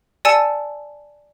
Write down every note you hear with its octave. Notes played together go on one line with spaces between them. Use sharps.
D5 G#5 A5 E6 C#7